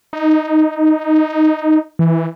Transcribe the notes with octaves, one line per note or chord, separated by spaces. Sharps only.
D#4
E3